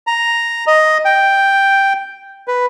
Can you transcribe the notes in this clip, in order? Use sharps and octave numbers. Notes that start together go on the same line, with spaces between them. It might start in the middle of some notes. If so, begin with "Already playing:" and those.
A#5
D#5
G5
B4